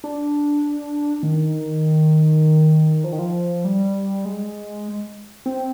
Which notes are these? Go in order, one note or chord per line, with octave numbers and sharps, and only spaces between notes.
D4
D#3
F3
D#3
F3
G3
G#3
C4